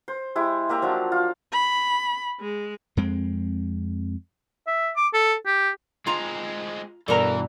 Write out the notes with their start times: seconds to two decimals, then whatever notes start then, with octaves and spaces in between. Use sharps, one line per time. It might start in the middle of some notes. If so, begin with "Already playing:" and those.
0.08 C5
0.36 G#3 E4 G4
0.69 A#3 G4 E5 A#5
0.82 F3 F#3 D4
1.12 F4
1.52 B5
2.40 G#3
2.97 F2 G#3 C4
4.67 E5
4.96 D6
5.14 A4
5.46 G4
6.07 G#3 C4 F4 A#5
7.08 G2 B2 E3 A4 A#4 D5 A#5